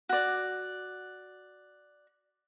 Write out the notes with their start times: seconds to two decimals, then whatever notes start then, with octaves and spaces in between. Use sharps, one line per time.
0.09 F#4 D5